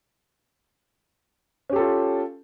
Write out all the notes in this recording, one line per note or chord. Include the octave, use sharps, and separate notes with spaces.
C#4 F4 G4 A4